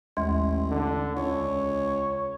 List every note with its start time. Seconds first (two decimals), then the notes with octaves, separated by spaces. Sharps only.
0.17 A1 D#2 G#3 C6
0.70 D3
1.17 C#2 C#5